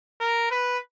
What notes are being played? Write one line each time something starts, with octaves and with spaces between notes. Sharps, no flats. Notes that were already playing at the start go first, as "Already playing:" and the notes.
A#4
B4